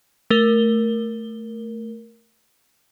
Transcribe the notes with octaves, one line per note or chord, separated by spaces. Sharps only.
A3 A#4 G7